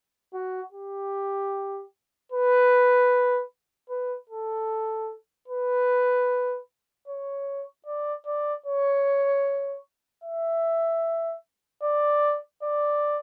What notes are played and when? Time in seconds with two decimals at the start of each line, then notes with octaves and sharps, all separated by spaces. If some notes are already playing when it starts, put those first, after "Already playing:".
0.34 F#4
0.73 G4
2.32 B4
3.90 B4
4.30 A4
5.48 B4
7.08 C#5
7.86 D5
8.26 D5
8.66 C#5
10.24 E5
11.83 D5
12.63 D5